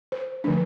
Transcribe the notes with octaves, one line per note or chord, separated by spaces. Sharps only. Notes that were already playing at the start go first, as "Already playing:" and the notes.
C5
D3 F3 A3 D4